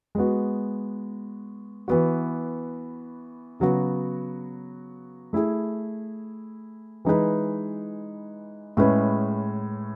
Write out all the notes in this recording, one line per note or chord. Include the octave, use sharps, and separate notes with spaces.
G#3 B3 F#4
E3 B3 F#4
C#3 F#3 B3 F#4
A3 E4 G#4
E3 G#3 D#4 G#4 B4
A2 G#3 C#4 G#4 B4